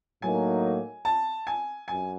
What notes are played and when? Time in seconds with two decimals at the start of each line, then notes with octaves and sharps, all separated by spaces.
0.22 A2 F#3 A#3 D#4 G#5
1.05 A5
1.47 G#5
1.88 F#2 G#5